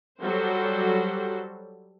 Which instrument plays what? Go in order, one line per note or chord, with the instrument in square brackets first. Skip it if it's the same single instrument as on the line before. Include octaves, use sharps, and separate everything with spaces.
[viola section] F#3 G3 F#4 A4 C5